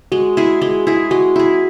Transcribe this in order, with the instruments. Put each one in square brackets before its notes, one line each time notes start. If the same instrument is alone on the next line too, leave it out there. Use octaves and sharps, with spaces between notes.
[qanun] G#3 [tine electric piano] F#4
[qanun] E4 G#4
G#3
E4 G#4
[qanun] G#3 [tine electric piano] F#4
[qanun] E4 G#4